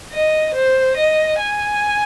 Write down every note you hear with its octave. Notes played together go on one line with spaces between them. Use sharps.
D#5
C5
D#5
G#5